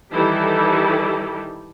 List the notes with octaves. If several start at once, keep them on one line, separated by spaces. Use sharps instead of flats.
D#3 E3 G3 E4 G4 A4